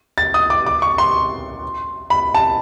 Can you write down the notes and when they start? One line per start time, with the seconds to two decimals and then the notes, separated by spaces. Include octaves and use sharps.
0.18 A6
0.34 D#6
0.50 D6
0.66 D6
0.82 C#6
0.98 C6
2.10 B5
2.34 A5